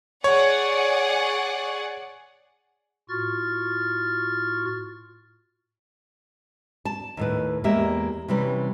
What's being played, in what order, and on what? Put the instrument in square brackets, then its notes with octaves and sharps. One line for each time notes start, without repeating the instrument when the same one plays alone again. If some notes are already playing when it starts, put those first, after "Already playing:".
[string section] G#4 D5 F#5 [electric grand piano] C#5
[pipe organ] A2 F4 F#4 C#6 F6 A6
[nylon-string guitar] A5
D#2 A2 B4
E2 G#3 A#3 G4 E5
C3 E3 G3 C#4 B4